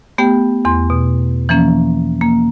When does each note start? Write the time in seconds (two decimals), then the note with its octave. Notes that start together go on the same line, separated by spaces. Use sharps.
0.18 A3 B3 G4 G5
0.65 E2 C6
0.90 B2
1.49 E3 F3 A#3 C#4
2.21 A#3